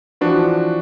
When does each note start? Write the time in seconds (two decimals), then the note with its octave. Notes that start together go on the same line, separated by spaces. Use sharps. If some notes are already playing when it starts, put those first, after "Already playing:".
0.21 E3 F3 D4 F#4 B4